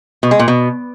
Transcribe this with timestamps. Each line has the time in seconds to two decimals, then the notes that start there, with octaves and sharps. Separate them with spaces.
0.23 B2
0.31 G#3
0.39 A#2
0.48 B2